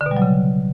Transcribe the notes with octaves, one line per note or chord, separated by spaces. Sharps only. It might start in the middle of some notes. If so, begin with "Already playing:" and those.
D3
B2
G3
F#3
C#3